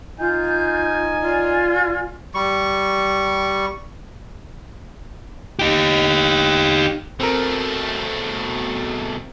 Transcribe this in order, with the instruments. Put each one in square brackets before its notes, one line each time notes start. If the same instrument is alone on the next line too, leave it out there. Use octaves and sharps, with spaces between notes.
[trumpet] D#4 [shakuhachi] F4 [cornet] G#5 [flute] G6
[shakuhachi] F4 [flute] D5
[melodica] G3 C#6
[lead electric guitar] D#4 G4
[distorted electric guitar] B2 A3 [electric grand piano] C4 A#4